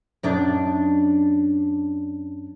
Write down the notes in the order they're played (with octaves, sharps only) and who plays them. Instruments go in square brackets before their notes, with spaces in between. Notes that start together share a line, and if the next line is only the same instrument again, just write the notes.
[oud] F#2 D4 D#4